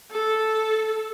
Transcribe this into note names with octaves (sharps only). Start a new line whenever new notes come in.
A4